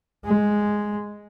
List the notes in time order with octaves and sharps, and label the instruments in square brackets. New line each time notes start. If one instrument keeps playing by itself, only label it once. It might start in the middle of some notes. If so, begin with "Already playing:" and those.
[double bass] G#3